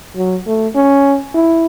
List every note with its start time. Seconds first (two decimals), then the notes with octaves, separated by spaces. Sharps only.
0.16 F#3
0.47 A3
0.75 C#4
1.34 E4